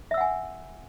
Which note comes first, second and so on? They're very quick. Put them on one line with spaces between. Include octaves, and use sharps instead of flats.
E5 E6 F#5 G#5